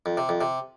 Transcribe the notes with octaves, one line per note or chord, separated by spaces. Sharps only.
F2
C3
F2
C3